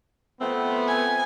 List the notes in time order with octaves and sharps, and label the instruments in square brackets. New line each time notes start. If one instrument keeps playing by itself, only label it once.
[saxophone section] F3 A3 C4 [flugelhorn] B3
[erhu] G#5